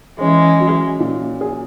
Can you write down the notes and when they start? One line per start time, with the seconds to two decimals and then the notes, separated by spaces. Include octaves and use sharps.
0.20 E3 G#3 C#4
0.60 F#3
1.00 A#2
1.41 G#4